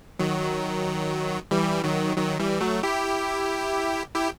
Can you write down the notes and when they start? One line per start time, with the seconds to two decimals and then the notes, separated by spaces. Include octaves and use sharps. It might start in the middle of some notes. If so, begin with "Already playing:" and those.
0.19 D#3 F#3
1.51 E3 G3
1.84 D#3 F#3
2.17 D#3 F#3
2.40 E3 G3
2.61 F#3 A3
2.83 E4 G4
4.15 E4 G4